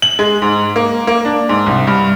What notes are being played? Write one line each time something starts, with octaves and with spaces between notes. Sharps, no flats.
F#7
G#3
G#2
A#3
A#3
D4
G#2
C2
G2